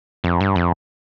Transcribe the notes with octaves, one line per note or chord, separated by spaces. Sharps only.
F2
G2
F2